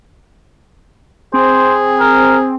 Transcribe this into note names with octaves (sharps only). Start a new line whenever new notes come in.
C4 G#4 C5
A#4